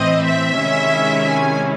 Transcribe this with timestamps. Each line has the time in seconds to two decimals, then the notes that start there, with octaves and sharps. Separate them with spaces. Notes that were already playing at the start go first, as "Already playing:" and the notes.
Already playing: A2 E3 C4 D#5
0.25 E5
0.58 C3 D#3 G#3 C#4 E4
1.27 G#5